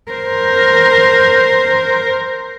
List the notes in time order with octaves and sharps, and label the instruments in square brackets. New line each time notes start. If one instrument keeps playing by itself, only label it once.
[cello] A#4 C5